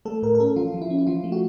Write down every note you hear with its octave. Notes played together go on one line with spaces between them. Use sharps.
A3 A4
A2 A#4
A#4
C#4 A4
F3 F4
F3
E4
C#4
E4
F3 F4
A3
F#4